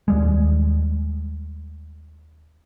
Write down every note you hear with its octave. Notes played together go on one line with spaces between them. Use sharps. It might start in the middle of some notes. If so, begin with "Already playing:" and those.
D#2 G3 G#3